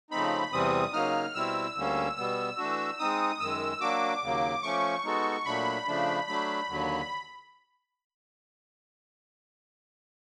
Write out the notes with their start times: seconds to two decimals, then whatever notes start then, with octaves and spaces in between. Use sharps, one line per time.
0.11 C#3 F3 A3 C4 D#4 B5
0.52 E2 C3 E3 G3 C4 D#6
0.93 C#3 F#3 A#3 D#4 F6
1.34 B2 G3 C4 E4 E6
1.76 D2 D3 G3 A#3 C#4
2.16 B2 G3 B3 E6
2.58 E3 A3 D4 F#4
2.99 G#3 C4 D#4 D#6
3.40 F#2 D#3 G#3 E6
3.80 F#3 A#3 D4 F#4 D6
4.21 D#2 C#3 F#3 A#3
4.63 F3 A3 C#4 C#6
5.04 G#3 B3 D#4 F#4 A4
5.45 A#2 F#3 A3 D4 B5
5.87 C#3 F3 A3 D4
6.27 F#3 A3 D4 B5
6.69 D#2 D3 F#3